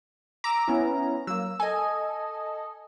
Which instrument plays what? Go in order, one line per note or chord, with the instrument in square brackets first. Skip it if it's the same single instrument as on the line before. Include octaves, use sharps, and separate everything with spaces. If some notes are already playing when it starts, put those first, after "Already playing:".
[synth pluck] A#5 [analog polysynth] D6 E6
[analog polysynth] B3 C#4 E4
[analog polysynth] F#3 A#3 [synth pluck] E6
[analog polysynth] A4 D#5 [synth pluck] G#5